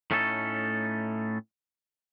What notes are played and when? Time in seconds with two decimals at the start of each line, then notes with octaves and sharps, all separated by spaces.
0.11 A2 A3 C#4 D#4 G#4 A4